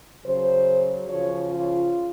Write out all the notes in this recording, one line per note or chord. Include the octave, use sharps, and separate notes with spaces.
C#3 F#3 C5
C#3 F3 C#5
F4